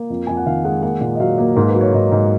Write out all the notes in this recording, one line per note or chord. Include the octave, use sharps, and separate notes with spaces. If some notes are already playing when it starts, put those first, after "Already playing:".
Already playing: A#3
F2
F2 G#5
F#5
D#3 F5
G#3 F#5
A#3 F#5
A#2
D#5
F#3 F5
A#3
G#2 A#4
B4
F#3
C#5
G#2 D#5
G#2